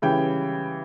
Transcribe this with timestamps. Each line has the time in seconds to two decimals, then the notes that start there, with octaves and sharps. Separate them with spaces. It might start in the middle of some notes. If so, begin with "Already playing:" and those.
0.02 C#3 E3 G3 G5